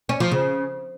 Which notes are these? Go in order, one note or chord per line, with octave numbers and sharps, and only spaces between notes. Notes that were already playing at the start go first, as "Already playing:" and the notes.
C#4
F3
C#3